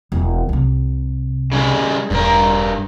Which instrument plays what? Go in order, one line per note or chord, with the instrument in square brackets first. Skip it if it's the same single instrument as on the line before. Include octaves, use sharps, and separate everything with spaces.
[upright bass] E1 E3
C2 C3
[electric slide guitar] C#3 G3 G#3
[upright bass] E1 D4 [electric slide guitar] G2 A#4